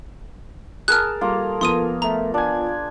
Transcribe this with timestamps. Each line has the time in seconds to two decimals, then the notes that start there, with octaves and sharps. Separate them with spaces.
0.88 G#4 A#4 A5 F6 F#6
1.21 G3 A#3 F4 A4 A#5
1.61 F3 B3 A#4 C6 D#6 D#7
2.02 A3 A#5
2.34 D4 F4 G#5